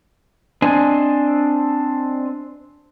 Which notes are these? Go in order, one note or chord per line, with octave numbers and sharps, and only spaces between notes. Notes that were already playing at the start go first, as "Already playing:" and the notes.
C4 D4 C5 D#5 G#5